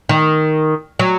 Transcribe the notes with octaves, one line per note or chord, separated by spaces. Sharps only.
D#3
F#3